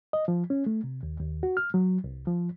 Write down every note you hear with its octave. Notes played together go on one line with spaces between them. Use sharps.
D#5
F3
C#4
A3
C3
D#2
D#2
F#4
F6
F#3
C2
F3